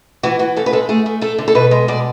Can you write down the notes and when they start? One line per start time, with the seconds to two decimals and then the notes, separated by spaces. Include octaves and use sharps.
0.23 E3 F#4
0.39 E3 F#4
0.56 C#3 A4
0.66 B4
0.73 G#3 A4
0.89 A3 G#4
1.06 A3
1.21 A3 A4
1.38 D3
1.48 A4
1.55 B2 B4
1.71 G#3
1.88 B2 D5